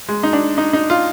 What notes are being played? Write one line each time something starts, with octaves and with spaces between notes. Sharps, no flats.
G#3
D#4
D4
D#4
D#4
F4